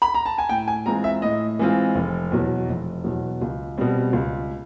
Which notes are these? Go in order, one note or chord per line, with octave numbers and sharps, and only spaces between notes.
B5
A#5
A5
G#5
A2 G5
G#5
E3 G#3 C4 F4 A#5
E5
A2 D#5
E3 G#3 C4 F4
F1
E2 B2 F#3
F1
E2 B2 F#3
C#2
B2 G3 C4
C#2